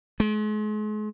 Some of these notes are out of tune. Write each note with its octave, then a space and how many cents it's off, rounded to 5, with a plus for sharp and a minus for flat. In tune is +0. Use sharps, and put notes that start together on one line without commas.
G#3 +40